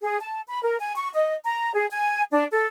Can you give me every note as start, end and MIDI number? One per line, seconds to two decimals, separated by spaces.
0.03 0.17 68
0.20 0.41 81
0.48 0.61 83
0.63 0.77 70
0.80 0.94 80
0.96 1.09 85
1.14 1.34 75
1.45 1.71 82
1.74 1.85 68
1.91 2.22 80
2.32 2.44 62
2.51 2.66 69